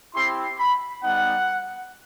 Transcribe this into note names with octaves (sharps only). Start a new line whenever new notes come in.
C4 E4 G4 C6
B5
G3 B3 D#4 F#5